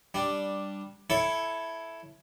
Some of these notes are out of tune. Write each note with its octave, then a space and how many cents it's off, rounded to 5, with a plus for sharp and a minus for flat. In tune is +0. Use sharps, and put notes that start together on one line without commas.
G3 +0 D4 +0
E4 +0 A4 +0 C#5 +0